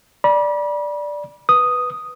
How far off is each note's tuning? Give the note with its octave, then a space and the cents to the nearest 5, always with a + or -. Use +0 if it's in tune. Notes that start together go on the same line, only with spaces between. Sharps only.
D5 +0 B5 -40
B4 +5 D#6 +0